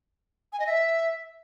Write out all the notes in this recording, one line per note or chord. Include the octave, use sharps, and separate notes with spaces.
G#5
D#5
E5